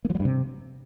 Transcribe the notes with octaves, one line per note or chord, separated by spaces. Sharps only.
A#3
F3
F#3
G2
C3